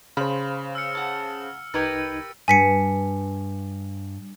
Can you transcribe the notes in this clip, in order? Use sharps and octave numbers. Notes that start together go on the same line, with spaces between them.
C#3 C5 F5 B5
E6 F6 C#7
F#5 A5
C2 D#4 G4 A#4 B4 G#6 A6 C#7
G2 G#5 B6 C#7